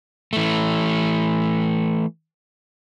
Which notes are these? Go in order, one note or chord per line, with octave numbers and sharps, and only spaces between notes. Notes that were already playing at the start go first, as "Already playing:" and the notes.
E3 A3